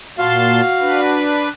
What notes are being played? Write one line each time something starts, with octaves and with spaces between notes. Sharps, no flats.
A#2 F#4 F5 A5 C6
D4 B4